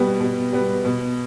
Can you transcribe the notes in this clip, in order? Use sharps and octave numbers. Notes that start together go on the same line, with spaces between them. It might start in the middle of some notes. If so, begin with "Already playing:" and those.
Already playing: B2 G3 B3
B2
G3 B3
B2